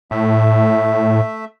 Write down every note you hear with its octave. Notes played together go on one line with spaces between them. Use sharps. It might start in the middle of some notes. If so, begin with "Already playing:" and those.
A2 A3 E5